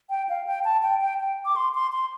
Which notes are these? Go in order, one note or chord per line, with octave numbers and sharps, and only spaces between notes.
G5
F5
G5
A5
G5
G5
G5
D6
C6
C6
C6